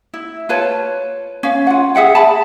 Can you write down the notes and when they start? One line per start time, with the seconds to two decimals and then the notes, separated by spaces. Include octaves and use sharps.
0.14 E4
0.49 F4 B4 C#5 A5
1.43 C#4 F5
1.67 F4 F#5
1.95 G#4 E5 F#5 G5
2.15 A5 B5